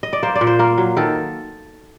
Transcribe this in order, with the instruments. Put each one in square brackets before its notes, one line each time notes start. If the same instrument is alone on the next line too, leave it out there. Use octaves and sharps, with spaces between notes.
[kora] D#5
D5
A#3 C5
D5
A#2
C5
A#3 A#4
F#3
D#3 A4